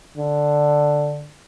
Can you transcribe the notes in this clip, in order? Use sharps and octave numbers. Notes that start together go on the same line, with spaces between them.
D3